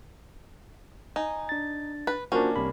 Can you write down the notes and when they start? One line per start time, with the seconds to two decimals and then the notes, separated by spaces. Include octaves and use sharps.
1.16 D#4 G#5
1.49 D4 A6
2.07 B4
2.32 A#3 C#4 D4 F4 F#4 C5
2.56 C2 C3 B5